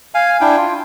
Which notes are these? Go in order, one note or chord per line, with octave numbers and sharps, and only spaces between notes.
F5 G#5
D4 E4 G5
F4